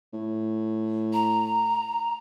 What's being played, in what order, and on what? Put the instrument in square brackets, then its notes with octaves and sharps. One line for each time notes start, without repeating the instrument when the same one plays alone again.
[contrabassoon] A2
[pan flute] A#5